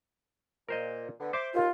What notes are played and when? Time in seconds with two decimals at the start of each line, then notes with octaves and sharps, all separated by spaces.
0.69 A#2 A#4 C5 D#5
1.20 D3 B3
1.33 C5 E5 C6 D6
1.54 D#2 F4